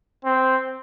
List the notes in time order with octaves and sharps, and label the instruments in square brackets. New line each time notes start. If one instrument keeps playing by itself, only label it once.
[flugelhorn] C4